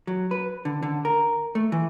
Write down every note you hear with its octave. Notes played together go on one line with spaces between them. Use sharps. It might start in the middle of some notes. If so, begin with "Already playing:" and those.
F#3
B4
D3
D3
A#4
A3
E3